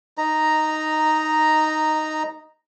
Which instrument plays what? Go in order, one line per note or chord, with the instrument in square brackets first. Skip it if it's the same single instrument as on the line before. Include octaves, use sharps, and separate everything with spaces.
[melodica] D#4 A#5